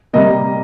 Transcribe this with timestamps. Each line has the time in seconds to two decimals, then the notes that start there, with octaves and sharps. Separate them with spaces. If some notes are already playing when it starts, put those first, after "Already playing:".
0.13 C3 G3 A#3 D#5